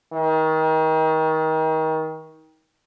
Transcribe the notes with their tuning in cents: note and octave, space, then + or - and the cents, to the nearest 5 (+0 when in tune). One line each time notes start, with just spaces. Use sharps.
D#3 +30